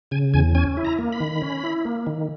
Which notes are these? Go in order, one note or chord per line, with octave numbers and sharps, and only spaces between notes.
C#3 G#5
E2 G#5
C#4 G#5
E4
A#5
A#3
B5
D#3
C#4
E4
A#3
D#3